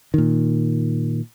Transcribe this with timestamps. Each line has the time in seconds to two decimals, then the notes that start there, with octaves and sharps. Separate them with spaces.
0.14 A#2 D#3